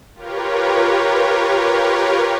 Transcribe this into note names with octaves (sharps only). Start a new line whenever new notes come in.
F4 G4 A#4 B4 C#5